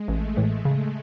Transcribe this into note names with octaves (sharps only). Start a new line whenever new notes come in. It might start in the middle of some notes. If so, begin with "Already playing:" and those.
Already playing: G#3
A1 A3
A2 E3
C#3